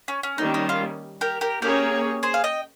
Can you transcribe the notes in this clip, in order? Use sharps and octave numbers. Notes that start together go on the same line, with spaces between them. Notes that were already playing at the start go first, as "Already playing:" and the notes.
C#4
C#4
D#3 G3 A#3 C#4 D#4
D#4
F4
G4 A#4
G4 A#4
A#3 C#4 G4 G#4 A#4 C#5
G#4 C5
F5
D#5 G5